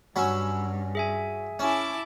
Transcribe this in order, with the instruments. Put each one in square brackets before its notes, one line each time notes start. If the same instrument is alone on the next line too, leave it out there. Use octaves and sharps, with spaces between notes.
[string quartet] G2 [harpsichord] F#3 C#4 [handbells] B5 E6
[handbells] G#4 E5 G#5
[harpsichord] C#4 [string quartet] E4 A5 D6